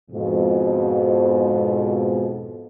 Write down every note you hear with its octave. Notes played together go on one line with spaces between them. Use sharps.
F2 G#2 B2